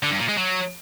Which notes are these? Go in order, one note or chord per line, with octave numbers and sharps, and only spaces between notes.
D3
G2
A#2
G#3
F#3